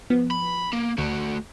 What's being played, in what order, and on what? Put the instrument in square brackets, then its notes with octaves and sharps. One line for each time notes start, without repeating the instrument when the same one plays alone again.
[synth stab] F3 B3
[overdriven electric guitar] B5
A#3
[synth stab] D2 [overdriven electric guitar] A3 F#4